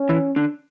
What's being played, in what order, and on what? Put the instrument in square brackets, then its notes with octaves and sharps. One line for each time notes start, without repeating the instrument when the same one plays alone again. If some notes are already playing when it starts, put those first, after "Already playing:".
Already playing: [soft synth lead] C#4
[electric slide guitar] E3 E4
D3 D4